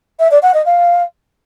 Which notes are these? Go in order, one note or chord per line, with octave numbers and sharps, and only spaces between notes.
E5
D5
F#5
D#5
F5